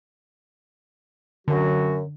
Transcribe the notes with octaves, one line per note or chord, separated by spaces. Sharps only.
F#2 D3 F#3 F#4